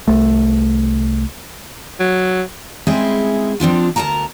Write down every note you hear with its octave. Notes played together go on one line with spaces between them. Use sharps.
C2 A3
F#3
G#3 C4 C#4 E4 G#4 E5
F3 C4 D4 F4
D2 C3 A#4 A5 A#5